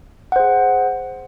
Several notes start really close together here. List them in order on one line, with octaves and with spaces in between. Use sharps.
F#5 C5 G#4